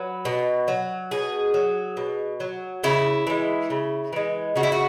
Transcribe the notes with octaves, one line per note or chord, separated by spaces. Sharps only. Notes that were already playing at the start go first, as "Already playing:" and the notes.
Already playing: F#3 B4
B2
F#3
B2 G#4
F#3
B2
F#3
C#3 E4
E3 G#3
C#3
E3 G#3
C#3 F#4
E4
F#4